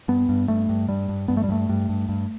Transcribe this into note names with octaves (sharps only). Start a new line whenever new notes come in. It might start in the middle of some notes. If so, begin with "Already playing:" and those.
G2 B3
G2
G2 A3
G2
G2 G3
G2
G2 B3
A3
G3
G2 A3
G2
G2
G2